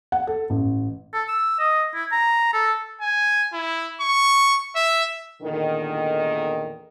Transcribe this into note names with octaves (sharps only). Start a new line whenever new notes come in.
F#5
A4
A1
A4
E6
D#5
E4
A#5
A4
G#5
E4
C#6
E5
E2 A#2 D3 D#3